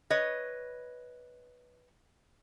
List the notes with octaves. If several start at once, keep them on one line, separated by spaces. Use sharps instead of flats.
B4 C#5 D#5